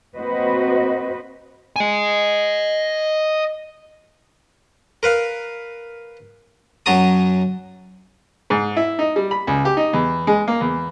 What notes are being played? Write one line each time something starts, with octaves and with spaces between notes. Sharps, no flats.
A#3 C4 F#4 B4 C5 D#5
D#5 G#5
A#4 B4 F5
F#2 F#3 A5 A#5 D#6
G#2
E4
D#4
G3
B5
C#2
G4
D#4
E2
G#3
A#3
E2